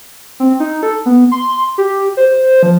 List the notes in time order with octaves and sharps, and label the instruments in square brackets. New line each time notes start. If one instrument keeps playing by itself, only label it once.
[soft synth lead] C4
D#4
A4
B3
C6
G4
C5
F3